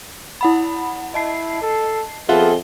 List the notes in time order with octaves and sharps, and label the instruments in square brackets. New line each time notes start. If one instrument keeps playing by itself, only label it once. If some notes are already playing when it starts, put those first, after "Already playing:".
[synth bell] E4 F#5 B5
[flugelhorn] E4 [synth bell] D#5 A5 C7
[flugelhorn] A4
[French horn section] F2 G#4 A4 [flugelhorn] B3 [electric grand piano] F4 E5 F#5 [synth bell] G7